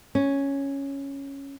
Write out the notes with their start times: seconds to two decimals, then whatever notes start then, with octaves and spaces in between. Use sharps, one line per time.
0.15 C#4